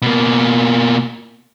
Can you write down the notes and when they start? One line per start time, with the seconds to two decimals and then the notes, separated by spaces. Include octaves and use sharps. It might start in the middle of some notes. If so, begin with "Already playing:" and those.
0.02 B2 A#3